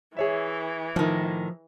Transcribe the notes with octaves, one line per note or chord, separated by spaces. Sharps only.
E3 G#4 C#5 E5
A2 D#3 F3